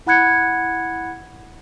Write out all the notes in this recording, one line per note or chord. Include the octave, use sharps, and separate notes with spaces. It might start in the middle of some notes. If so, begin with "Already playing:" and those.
E4 F#5 B5 F#6 G#6 C#7